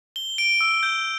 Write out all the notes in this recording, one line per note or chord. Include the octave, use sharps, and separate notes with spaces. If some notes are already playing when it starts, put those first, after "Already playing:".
G7
D7
E6
G6